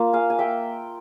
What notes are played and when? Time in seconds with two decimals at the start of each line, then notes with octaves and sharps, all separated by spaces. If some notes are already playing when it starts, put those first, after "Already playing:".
Already playing: A#3 F4
0.13 F5 G#5
0.30 G#5
0.39 E5 G5